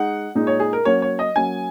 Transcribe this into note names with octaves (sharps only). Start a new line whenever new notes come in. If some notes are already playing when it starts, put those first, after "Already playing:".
Already playing: G#3 D#4 F#5
A#2 G#3 D#4
C#5
G#4
A#4
F#3 A#3 C#4 C#5
C#5
D#5
F#3 A#3 C#4 G#5